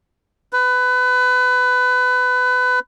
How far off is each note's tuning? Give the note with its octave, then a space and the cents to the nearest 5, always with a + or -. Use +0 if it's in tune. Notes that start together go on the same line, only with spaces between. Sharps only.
B4 +25